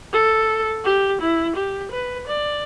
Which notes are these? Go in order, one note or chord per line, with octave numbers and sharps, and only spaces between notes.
A4
G4
E4
G4
B4
D5